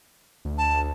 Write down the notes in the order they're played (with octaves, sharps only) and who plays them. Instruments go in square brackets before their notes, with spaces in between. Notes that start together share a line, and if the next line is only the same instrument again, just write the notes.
[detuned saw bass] D2
[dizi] A5